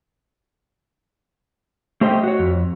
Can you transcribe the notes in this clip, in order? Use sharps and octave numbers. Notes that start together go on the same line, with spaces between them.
A3 G4 C5 D#5 G5
F#4 C#5
F2